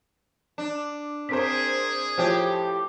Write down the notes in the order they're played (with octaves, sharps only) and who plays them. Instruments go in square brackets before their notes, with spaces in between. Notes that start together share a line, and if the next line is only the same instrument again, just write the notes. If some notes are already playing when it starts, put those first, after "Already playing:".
[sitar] D4
[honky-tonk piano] C4 A#4 C5 [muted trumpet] G#4 [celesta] B6
[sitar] A2 G4 [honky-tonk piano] F3 [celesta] C5 C#5